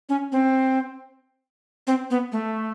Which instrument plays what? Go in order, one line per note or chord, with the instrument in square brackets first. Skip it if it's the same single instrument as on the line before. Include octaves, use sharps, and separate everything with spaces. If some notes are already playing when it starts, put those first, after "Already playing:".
[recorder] C#4
C4
C4
B3
A3